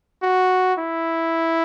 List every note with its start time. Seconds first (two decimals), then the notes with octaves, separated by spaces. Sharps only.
0.22 F#4
0.79 E4